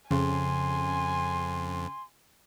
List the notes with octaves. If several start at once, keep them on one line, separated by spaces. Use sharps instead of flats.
F2 C#3 G#5 C6